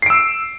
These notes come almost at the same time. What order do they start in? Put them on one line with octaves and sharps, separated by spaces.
C7 D7 E6